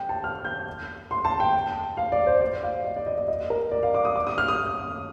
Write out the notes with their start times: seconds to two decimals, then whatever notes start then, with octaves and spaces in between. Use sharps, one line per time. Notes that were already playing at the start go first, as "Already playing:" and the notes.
Already playing: G5
0.09 A5
0.24 F6
0.45 G6
1.11 C6
1.25 A5
1.40 G5
1.97 F5
2.12 D5
2.26 C5
2.41 D5
2.63 F5
2.84 D#5
2.96 D5
3.06 D#5
3.17 D#5
3.28 D#5
3.50 A#4
3.71 D5
3.83 F5
3.94 D6
4.05 D#6
4.16 D6
4.27 D#6
4.38 F6
4.48 D#6